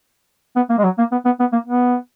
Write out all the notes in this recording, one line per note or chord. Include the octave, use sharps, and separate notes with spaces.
B3
A#3
G#3
F#3
A#3
B3
B3
B3
A#3
B3